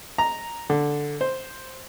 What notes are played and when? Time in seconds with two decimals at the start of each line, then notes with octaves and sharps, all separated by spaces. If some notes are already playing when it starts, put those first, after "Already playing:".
0.18 A#5
0.70 D3
1.21 C5